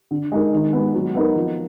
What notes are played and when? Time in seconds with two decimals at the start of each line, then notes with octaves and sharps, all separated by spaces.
0.11 D3
0.32 G#3 D#4 A#4
0.53 D#3
0.73 G#3 B3
0.94 F#3
1.15 B3 D#4 A#4
1.36 F3